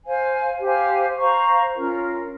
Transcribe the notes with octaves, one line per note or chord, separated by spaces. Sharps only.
C5 F5 G#5
G4 C5 F5 G#5
C5 F5 A#5 C#6
C#4 F4 A#4